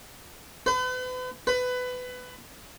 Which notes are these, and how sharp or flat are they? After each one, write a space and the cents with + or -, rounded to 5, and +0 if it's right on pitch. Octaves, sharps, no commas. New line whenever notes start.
B4 +40
B4 +20